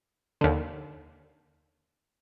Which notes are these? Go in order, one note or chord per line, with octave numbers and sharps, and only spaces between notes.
D#2 D3